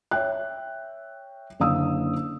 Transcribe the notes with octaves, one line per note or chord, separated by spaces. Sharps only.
C#5 E5 G5 F#6
F#1 D3 F5 D#6 E6